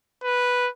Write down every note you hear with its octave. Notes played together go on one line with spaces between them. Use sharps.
B4